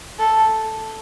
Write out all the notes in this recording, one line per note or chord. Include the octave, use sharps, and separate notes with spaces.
A4